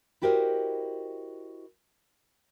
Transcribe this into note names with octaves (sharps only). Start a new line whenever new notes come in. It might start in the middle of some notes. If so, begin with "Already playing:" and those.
E4 F#4 G4 A#4 C5 D#5